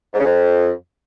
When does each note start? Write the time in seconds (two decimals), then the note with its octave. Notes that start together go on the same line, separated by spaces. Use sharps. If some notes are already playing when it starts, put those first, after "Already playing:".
0.14 G#2
0.19 C#3
0.25 F2